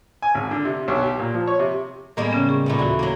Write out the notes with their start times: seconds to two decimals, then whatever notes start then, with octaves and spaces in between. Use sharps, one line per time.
0.22 G#5
0.35 G#1
0.51 D3
0.65 C3
0.88 B1
1.02 G4
1.19 A#2
1.34 F3
1.47 C#5
1.59 C3
2.17 A2 G3 G#3 A#3 B3
2.33 C#3 C#4
2.49 G#4 C#6
2.66 A#2 A3 B3
2.79 D#2 E3 F#4
2.99 F#3 A#3